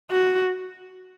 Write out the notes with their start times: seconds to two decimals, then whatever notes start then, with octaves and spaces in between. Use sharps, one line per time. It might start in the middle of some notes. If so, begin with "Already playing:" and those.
0.11 F#4